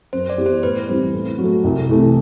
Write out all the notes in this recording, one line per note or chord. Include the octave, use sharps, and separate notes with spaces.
F#2 C5
D5
E3 B3 E4 G4
C5
A2 B4
E3 G3 C4
A2
F#3
A3
C2
C3 E3 A3